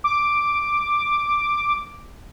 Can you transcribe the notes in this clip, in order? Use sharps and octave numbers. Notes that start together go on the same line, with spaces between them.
D6